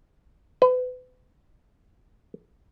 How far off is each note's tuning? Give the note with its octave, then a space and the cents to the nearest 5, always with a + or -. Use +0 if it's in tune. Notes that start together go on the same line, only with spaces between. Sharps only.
B4 +35